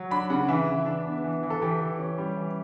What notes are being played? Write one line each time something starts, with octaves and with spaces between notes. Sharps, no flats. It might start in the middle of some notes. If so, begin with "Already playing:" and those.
Already playing: F#3
D4 B5
C#3 F#5
E3 E5
E3
D4
B3
E3
E3
A4
E3 G4
E3
C#4
G3
E3